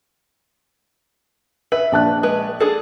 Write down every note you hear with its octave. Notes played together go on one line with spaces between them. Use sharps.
B4 E5
A#1 A5 F#6
G#3 B4
D4 G#4 A4